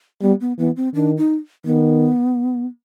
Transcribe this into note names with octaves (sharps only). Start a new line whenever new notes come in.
G3 B3
B3
E3 B3
C4
D#3 D4
D#4
D#3 B3